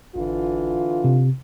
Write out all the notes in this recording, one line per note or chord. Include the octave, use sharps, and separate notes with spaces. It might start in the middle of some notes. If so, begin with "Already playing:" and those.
G#1 D3 E3 F4
C3